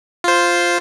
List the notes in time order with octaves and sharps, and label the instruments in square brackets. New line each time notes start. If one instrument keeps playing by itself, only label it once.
[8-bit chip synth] F4 C5